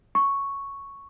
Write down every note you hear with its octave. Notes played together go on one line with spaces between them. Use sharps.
C#6